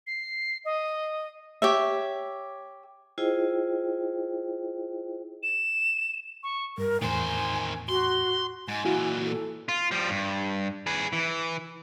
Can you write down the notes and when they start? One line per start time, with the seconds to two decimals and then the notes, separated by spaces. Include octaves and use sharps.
0.07 C7
0.65 D#5
1.62 G4 C#5 E5
3.18 E4 F4 G#4 C5 D#5 G5
5.43 E7
6.43 C#6
6.78 G2 A#4
7.01 E2 A2 D#3 C5 G#5
7.89 F#4 C6
8.68 G#2 G#5
8.85 A#2 E3 E4 F#4
9.25 A4
9.69 F4
9.91 F3 G3
10.10 G2
10.87 G#4 B4
11.13 E3